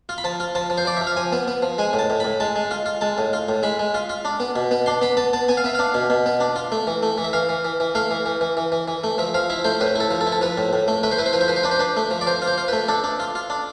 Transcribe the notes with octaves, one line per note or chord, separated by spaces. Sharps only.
F4
B5
F3 A5
F4
F3 A5
F3
C5
F3 D5
F3 E5
F5
F3 G#5
B3
B3
F3
G#3 G#5
A2
A5
A2
A2 B5
G#3 A5
G#3
F4
F4
G#3 A5
A2
F4
A2
G#3 B5
G#3
F4
F4
D4
B3
B2
B3
D4 C6
B3 B5
B3 A5
B3 A5
B3 G#5
F5
B3 E5
D4 F5
B2
B2
B3
D4
F4
A3
E3
A3
E3
E5
E3 F5
E3
E3
E3
A3 F5
E3
E3
E3
E3
E3
E3
A3
F3 E5
F3 F5
E4 E5
A3 C5
A2 B4
E4
A4
F3
A4
E4
A4
F3 B4
A2
A2
A3
A3 B4
C5
E4 B4
C5
F3 B4
C5
F3 B4
C5
D4 B4
C5
D4 B4
A3
F3
D5
F3 C5
F4
C5
F4
A3 B4
D4 A4
D4
F4
F4
D4